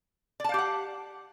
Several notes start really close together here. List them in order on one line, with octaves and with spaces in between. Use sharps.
D5 A5 F5 G4 F#5